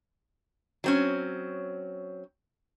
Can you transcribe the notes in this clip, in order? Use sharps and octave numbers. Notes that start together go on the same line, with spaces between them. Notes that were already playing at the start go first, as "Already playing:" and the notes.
F#3 C4 C#4